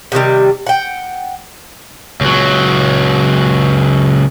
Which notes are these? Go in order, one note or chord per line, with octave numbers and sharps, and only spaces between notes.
C3 D#3 F#3 G3
F#5 G5
C#2 F#3